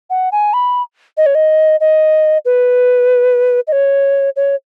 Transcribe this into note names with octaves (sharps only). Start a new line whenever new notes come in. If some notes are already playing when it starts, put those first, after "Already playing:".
F#5
G#5
B5
D#5
C#5
D#5
D#5
B4
D#5
C#5
C#5